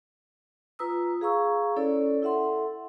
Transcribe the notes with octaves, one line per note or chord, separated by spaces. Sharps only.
F4 B4 A#5 D#6 E6
G#4 F5 A#5 C#6 E6
C#4 E4 A4 C#5 D5
E4 A4 E5 F#5 C6